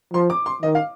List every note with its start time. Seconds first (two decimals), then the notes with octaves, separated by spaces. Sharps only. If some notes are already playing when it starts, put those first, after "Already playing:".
0.13 F3 C6
0.30 D6
0.46 C6
0.62 D#3 D#5
0.75 F5